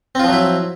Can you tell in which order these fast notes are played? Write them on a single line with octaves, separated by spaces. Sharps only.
C4 F4 F3 F#3 E4